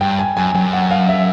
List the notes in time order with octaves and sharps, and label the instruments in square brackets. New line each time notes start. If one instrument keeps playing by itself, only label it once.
[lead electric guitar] G2 [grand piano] G5
[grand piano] G#5
[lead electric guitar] F#2 [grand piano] G#5
[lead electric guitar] F#2 [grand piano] G5
[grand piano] F#5
F5
E5